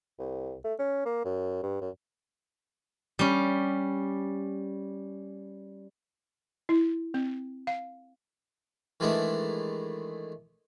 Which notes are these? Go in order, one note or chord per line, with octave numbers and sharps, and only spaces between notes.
C2
A3
C#4
A#3
F#2
G2
F#2
G3 C#4
E4
C4
F5
D#3 E3 G#3 A3 D4 E4